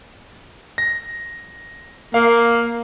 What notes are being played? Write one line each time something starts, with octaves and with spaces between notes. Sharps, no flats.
A#6
A#3 F5